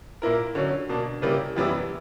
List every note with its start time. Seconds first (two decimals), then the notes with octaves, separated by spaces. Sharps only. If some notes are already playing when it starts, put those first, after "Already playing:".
0.22 A#2 A#3 E4 A#4
0.55 D3 F#3 C#4
0.89 B2 A#3 D4
1.22 C#3 G3 A#3 E4
1.56 F#2 E3 G3 B3 E4